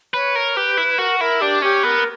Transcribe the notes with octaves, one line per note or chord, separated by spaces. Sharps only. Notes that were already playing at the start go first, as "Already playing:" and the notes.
B4 C#5
A#4
G4 B4
E4
F#4 A#4
E4 A#4
D4 G4
C#4 G4
B3 A#4